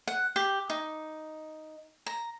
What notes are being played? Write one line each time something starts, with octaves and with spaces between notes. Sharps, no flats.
F#5
G4
D#4
A#5